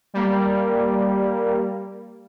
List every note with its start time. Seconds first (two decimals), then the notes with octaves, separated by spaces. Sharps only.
0.14 G3 A#3